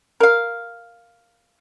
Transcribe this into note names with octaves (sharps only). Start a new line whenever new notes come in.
A#4 F5